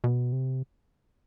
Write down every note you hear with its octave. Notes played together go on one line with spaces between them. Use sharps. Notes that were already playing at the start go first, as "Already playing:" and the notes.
B2
C3